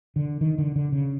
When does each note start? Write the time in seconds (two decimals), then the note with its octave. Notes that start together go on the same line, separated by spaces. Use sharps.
0.16 D3
0.41 D#3
0.58 D3
0.76 D3
0.92 C#3